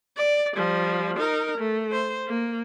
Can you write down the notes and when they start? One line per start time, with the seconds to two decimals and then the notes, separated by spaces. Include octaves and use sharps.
0.17 D5
0.57 F3 G3
1.17 D#4 A#4
1.58 A3
1.92 C5
2.27 A#3